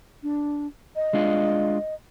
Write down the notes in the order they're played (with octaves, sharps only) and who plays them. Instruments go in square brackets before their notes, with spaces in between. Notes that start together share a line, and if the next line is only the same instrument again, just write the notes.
[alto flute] D4
D#5
[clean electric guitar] G#3 D4 F4